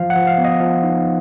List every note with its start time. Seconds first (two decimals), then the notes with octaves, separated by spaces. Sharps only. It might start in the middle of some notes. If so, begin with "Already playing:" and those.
Already playing: F3 F5
0.10 F#5
0.16 F3
0.27 F5
0.38 B3
0.44 D#5
0.60 F3 F5
0.83 D#4